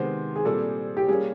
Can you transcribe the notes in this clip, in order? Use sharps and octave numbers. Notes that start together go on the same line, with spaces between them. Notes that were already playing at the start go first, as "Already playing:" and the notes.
Already playing: C3 D#3 G#3 B3 C5
G#4
A#2 G3 C4 A4
G4
G3 A#3 C#4 G#4